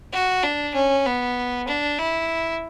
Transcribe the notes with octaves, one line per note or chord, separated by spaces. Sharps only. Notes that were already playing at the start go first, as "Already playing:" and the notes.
F#4
D4
C#4
B3
D4
E4